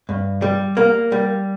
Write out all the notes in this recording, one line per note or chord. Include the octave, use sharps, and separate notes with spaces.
G2
G3
A#3
G3